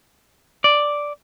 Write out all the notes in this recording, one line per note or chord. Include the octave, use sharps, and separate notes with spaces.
D5